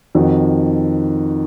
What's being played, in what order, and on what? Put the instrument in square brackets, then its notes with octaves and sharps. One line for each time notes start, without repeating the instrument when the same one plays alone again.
[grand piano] F2 D#3 F#4